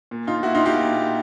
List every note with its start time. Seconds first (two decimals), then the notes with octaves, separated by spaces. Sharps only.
0.11 A#2
0.27 D#4 F4
0.43 A#2 E4 F#4
0.55 D#4 F4
0.65 F4 G4
0.76 A#2